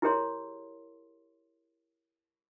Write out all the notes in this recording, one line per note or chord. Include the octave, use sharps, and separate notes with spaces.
E4 G4 G#4 A#4 C#5 C6